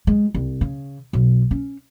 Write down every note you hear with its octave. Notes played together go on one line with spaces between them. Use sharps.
G#3
C2
C#3
B1
C#4